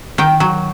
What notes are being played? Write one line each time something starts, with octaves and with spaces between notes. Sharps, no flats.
D#3 G5
F#3